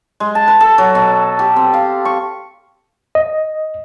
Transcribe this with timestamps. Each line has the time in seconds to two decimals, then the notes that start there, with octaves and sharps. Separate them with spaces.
0.20 G#3
0.35 A5
0.48 B4
0.61 A4
0.78 F#3
0.95 B2
1.39 G4
1.56 C4
1.74 F5
2.05 C#6
3.15 D#5